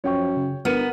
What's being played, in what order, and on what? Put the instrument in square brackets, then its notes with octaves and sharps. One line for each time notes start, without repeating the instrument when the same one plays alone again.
[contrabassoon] F#2 [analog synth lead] F3 [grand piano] C#5 G5 C#6
[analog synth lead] C#3
[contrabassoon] G1 [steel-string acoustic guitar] B3 [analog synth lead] A#4 [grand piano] F6 C#7 D#7